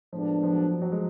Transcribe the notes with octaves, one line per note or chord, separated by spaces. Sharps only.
A2 F3 G#3 B3 D4
F3
F#3
F#3
G#3